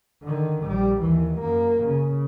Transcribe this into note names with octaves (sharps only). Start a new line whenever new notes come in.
D3 D#3
A#1 G3
D#2 E3
F#2 A#3
C#3